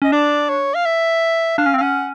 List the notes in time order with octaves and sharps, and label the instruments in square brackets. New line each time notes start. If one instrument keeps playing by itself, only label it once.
[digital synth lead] C#4 [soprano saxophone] D#5
[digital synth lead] D4 [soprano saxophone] D5
[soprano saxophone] C#5
F5
E5
[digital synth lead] D4 [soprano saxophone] F5
[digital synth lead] C#4
C4
[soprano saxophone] F5
[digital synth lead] C#4 [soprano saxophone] F#5